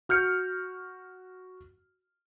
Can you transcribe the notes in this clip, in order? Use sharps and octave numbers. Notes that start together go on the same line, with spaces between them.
F#4 F6 G6 C#7